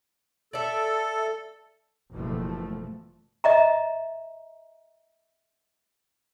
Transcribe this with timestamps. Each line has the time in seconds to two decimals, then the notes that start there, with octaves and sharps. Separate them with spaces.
0.53 A4 D5 E5
2.11 F#1 B2 E3 F3 A3
3.44 D#5 E5 A#5